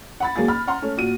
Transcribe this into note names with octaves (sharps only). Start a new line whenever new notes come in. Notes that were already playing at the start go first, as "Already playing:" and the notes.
F#5 B5 A6
D#2 F#3 A#3 G#4 A6
B5 F6
F#5 A#5 C6
A3 C#4
A#2 F#4 D#7